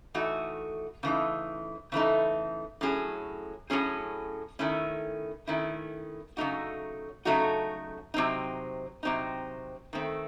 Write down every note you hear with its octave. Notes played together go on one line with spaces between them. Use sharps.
E3 A3 D#4 F#4
C#3 E3 A3 D#4
C#3 E3 A3 D#4
A2 F#3 C#4 G#4
A2 F#3 C#4 G#4
D#3 A3 C#4 E4
D#3 A3 C#4 E4
C#3 F#3 A3 D#4 F#4
C#3 F#3 A3 D#4 F#4
C3 F#3 C4 D#4
C3 F#3 C4 D#4
D#3 A3 C4